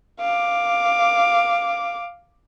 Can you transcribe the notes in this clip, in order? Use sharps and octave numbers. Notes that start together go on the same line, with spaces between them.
F5 D6